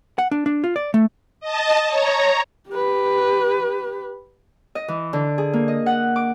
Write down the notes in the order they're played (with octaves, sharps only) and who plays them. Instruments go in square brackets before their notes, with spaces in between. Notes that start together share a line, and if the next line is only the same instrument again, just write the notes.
[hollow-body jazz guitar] F#5
D4
D4
F4
D5
A3
[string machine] D#5 A5
C#5 A#5
[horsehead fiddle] G4 B4
[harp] D#5
E3
D3
G#4
A#3
D#5
F#5
D6